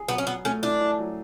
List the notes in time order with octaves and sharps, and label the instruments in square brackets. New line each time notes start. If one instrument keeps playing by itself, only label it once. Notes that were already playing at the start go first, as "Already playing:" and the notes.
Already playing: [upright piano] G#4
[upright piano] F#3 [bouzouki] B3
[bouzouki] C#4
[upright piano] F#3 [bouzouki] B3
[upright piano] A3 [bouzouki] C#4
[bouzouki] D4 [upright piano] E4
[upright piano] E4
F#3